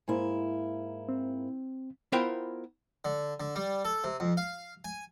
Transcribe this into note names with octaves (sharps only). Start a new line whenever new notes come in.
G#2 A#3 E4
C4
B3 E4 F4 A#4 C5 G5
D3
D3
G3
A4
C3
F2
F5
G#5